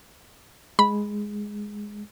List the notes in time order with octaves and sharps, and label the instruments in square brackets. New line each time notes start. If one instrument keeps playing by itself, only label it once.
[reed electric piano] G#3 [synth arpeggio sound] B5